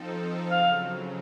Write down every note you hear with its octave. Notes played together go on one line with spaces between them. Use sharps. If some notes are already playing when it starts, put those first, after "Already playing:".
Already playing: F3 C4 D#4 A4
C#3 F#3 F5